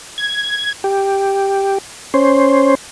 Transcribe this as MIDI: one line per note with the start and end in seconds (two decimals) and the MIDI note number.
0.18 0.73 92
0.84 1.78 67
2.14 2.75 61
2.14 2.75 72